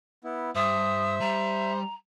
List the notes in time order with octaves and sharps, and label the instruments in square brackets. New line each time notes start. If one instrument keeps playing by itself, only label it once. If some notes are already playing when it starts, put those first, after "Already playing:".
[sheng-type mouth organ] B3 E4
[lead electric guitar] G2 [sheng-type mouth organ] C5 [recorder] E5 [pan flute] D#6
[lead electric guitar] G3 [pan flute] A#5